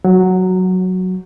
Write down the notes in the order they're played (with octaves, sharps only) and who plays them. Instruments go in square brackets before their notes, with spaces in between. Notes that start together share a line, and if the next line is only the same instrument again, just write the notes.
[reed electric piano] F#3